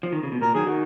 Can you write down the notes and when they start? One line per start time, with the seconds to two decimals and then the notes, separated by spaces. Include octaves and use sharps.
0.03 F3
0.12 D#3
0.23 C#3
0.32 B2
0.41 A#2 A#4
0.55 D#3 F#3 G#4
0.67 D#3 F#4